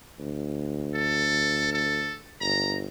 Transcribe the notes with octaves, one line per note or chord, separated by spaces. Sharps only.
D2
A4
A4
G1 A#5